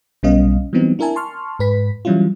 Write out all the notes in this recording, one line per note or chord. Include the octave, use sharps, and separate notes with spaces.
B1 G3 B3 C#4 D#5 F5
E3 F#3 G3 B3 C4 D#4
D4 E4 A#4 E5 G#5 A5
A5 C6 C#6 F6
G#2 B4 B6
E3 F#3 G3 C#4 E4 F4